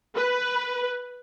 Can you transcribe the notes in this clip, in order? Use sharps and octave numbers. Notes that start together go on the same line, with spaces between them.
B4